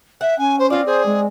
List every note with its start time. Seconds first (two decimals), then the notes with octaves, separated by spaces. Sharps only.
0.21 E5 F#5
0.38 C#4 G#5
0.59 C5
0.70 C4 F4 D5
0.86 G#4 C5
1.06 G#3